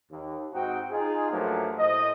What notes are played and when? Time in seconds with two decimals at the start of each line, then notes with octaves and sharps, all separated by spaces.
0.11 D#2
0.54 G#2 C4 D#4 F#4 G5
0.91 D#4 F4 G#4
1.30 G2 F3 F#3 A3 A#3
1.79 A2 C5 D#5